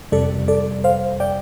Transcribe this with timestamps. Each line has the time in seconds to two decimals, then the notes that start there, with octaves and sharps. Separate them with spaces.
0.12 F2 C3 G3 A4 D5
0.48 A4 D5
0.84 C5 F5
1.20 D5 G5